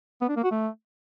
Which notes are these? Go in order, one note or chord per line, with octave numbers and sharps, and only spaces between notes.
B3
D4
A#3
F#4
A3